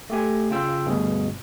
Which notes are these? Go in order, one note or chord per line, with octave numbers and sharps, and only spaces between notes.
A3 G4 G#5
C#3 F4 G5 E6
D2 G2 B2 G#4